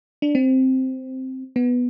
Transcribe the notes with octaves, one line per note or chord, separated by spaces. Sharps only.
D4
C4
B3